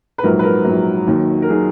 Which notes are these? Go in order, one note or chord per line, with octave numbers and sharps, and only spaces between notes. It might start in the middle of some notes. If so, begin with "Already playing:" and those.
B4
A#1 G#2 F#3 A#4
B4
A#4
A#1 G#2 F#3
D#2 D#3 F#3
A#4
D#3 F#3 G#4